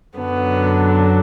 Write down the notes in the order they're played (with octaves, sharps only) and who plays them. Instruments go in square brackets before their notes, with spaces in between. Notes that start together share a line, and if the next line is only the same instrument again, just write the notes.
[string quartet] F#2 D3 F#3 B3